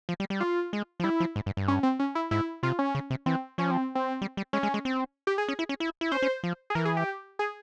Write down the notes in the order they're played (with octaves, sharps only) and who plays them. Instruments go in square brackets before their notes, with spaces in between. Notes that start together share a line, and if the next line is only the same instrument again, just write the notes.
[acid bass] F3
G3
G3
[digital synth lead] F4
[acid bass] G#3
F3
[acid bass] G3 [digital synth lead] E4
[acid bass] F3
G#2
G2
G2
[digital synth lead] C#4
C4
C#4
E4
[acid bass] G#2 [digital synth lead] E4
[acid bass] C3 [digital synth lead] F4
[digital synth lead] C#4
[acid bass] C#3
C3
[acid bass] E3 [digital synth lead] C4
[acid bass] F3 [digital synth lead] C#4
[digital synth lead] C4
C4
[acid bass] G3
G3
[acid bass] G#3 [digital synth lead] C#4
[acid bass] G#3
G#3
C4
[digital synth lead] G4
G#4
[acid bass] C#4
E4
C#4
E4
E4
[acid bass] C#4 [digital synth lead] C5
[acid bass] C#4
F3
[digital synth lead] G#4
[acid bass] E3 [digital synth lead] A#4
[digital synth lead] G#4
G4
G#4